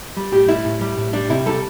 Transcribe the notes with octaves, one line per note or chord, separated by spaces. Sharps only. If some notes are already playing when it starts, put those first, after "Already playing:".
G3
A2 G4
G3 E4
A2
G3
A2
G3 D4
C3 E4
G3 A4